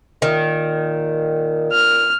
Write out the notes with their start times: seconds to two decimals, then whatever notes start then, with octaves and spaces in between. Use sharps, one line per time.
0.22 A#2 D#3
1.72 F6